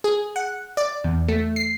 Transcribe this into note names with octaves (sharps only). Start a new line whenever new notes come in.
G#4
F#5
D5
E2
A3
C7